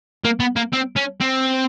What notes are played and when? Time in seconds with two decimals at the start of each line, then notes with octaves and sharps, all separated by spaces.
0.24 A#3
0.40 B3
0.56 A#3
0.73 C4
0.97 C#4
1.21 C4